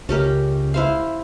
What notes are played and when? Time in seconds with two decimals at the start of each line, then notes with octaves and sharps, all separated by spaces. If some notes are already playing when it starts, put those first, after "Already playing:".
0.09 C#2 C#4 G4 A#4
0.74 E4 C5 F5